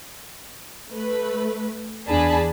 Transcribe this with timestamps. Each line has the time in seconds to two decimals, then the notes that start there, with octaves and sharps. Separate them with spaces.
0.91 A3 B4
2.08 E2 D4 G#4 D5 A5 B5